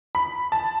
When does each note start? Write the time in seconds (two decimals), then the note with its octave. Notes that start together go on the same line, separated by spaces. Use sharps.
0.15 B5
0.52 A5